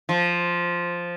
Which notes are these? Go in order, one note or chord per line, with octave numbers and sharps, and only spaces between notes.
F3